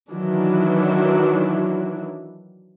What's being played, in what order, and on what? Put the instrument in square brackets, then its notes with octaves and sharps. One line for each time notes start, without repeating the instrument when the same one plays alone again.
[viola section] D#3 E3 F#3 D4 E4